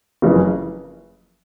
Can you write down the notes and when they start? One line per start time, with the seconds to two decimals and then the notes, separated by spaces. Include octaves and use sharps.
0.22 F#1 F2 C#3 E3